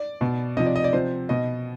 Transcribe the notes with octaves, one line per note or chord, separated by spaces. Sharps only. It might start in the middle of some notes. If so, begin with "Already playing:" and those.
Already playing: D5
B2
C3 F3 D#5
D5
D#5
D5
C3 F3 C5
B2 D#5